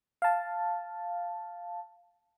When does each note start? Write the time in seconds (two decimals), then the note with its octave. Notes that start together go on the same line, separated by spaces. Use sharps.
0.22 F5 A5